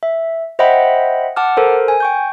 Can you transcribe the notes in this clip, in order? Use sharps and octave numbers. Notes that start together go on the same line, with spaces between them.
E5
C5 D#5 E5 F#5 G5 B5
F#5 A5 D6 F6
A4 A#4 C5
G#5
G5 C#6 G6